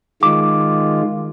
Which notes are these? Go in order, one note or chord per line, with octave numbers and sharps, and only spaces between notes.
D#3 G#3 F4 D6